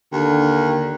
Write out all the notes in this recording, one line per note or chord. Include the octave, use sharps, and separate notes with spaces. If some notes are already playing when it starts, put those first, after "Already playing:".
D#2 D3